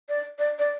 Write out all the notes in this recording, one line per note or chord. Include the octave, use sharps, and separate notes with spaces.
D5
D5
D5